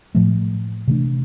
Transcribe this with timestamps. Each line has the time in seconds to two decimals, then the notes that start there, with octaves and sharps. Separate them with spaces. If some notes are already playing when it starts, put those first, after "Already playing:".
0.15 A2 F3 A3
0.88 C3 E3 A3 D4